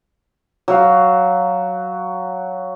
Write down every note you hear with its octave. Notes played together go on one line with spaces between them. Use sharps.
F#3 F5